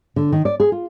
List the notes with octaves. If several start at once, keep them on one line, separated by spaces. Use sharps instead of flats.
D3
D#3
D5
G#4
F4